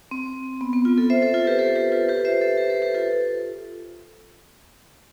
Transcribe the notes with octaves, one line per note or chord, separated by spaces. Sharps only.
C4
B3
B3
F4
F4 A4
C5 E5
A4 C5
F4 A4
G4 B4
A4 C5
G4 B4
F4 A4
G4 B4
C5 E5
A4 C5
G4 B4
A4 C5
G4 B4
F4 A4